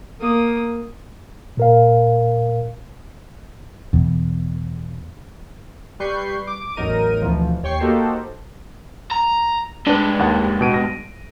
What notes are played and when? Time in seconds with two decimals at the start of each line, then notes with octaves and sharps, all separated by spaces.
0.21 A#3 D#6
1.57 A#2 A#4 F5
3.93 E2 B2
6.00 G3 B4 C#6 G6 C7
6.47 D6
6.76 A1 E2 F#3 D#4 A#4 D#7
7.22 D2 B2 E3 F3
7.63 D#2 C#5 G5 C#6 C7
7.80 A#3 D#4 F#4 G4 A4 C5
9.11 A#5
9.87 G2 G#3 D4 B4
10.19 D#2 F#5
10.61 B2 D7 D#7
10.74 A#6